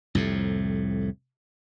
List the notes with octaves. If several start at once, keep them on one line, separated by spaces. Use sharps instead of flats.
C2 F2 A2